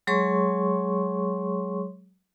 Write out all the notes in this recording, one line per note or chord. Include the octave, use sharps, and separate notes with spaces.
F#3 G#3 G#4 C#5 C6 C#6